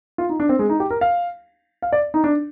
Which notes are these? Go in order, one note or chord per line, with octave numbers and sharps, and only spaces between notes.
F4
D#4
D4
C4
G#3
D#4
G4
A#4
F5
F5
D5
D#4
D4